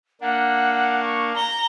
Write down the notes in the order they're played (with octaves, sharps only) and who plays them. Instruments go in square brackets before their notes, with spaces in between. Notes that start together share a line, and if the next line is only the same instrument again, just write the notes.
[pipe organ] A#3 D4 [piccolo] F#5
[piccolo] C#6
[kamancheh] A#5 [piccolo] G7